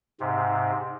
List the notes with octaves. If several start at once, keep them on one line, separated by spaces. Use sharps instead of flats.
G#2 C3